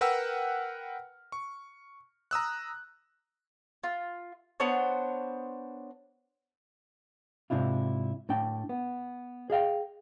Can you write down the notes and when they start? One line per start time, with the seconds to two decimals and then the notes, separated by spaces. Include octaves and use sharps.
0.01 A#4 B4 F#5 G5 E6 F6
1.32 C#6
2.31 A#5 D#6 E6 F#6
3.84 F4
4.60 B3 D4 C5 C#5
7.50 G#2 C3 D4 E4 F4
8.29 A2 D4 G5
8.69 B3
9.50 G#4 D#5 F5 G5